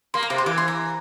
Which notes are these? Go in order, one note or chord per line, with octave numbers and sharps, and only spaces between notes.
A#3 C6
A#5
C3 D6
C6
E3 D6
C6
A#5